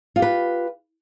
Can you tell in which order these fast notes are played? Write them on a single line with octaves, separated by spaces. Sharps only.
F4 G4 B4